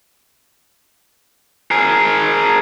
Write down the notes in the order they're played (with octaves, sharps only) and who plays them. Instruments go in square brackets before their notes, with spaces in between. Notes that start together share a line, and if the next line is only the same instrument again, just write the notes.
[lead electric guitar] G#4 A#4